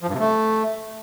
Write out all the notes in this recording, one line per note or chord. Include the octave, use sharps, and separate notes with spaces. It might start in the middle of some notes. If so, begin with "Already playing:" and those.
F3
G2
C3
A3